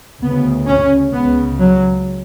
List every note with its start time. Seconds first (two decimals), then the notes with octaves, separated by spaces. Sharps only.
0.21 D2 C#3 B3
0.67 C#4
1.13 C#2 C#3 B3
1.59 F#3